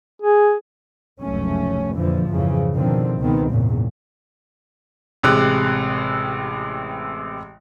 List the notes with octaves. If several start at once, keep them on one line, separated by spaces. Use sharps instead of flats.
G#4
F1 C#2 F#2 A3 C#4
F2 A#2 D3 E3 F3
F2 G#2 C#3 E3 F3
B2 D3 D#3 F3 C4
C#2 B2 D#3 B3 C4
G#1 E2 A#2 C#3
A1 C3 G#3 F#6